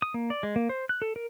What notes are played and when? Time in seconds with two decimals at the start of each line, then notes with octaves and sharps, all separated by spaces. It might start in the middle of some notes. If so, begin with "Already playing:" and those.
0.02 D#6
0.14 A#3
0.30 D5
0.43 G#3
0.56 A#3
0.69 C5
0.89 F#6
1.02 A4
1.16 A#4